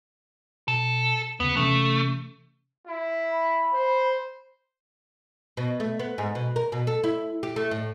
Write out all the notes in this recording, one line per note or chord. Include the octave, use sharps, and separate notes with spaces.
B2 A4
D#2 C#3 B3
C3 E3 A3 C#4
E4
B5
C5
B2
A3
B3
G#2
B2
A#4
B2
A4
E4
G4
A3
A2